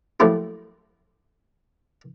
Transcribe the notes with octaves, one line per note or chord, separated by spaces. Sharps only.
F3 F#3 A3 A#3 E4 G4